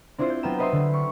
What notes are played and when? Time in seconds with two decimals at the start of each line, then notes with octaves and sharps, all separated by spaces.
0.18 C4 D4 E4 F4 C5
0.30 G6
0.43 F#3 B3 F4 G5 A#5 E7
0.58 B4 C5 D#5 E5 B5 C6
0.72 D3
0.94 C#6